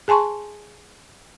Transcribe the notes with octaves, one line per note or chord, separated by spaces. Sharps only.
G#4 G#5 A5 C6 C#6